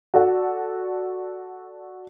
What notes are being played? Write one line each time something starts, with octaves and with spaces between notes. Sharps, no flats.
F#4 A4 D5 F#5